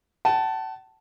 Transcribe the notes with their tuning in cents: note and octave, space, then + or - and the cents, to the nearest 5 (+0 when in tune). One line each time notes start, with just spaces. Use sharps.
F#5 +45 A5 +0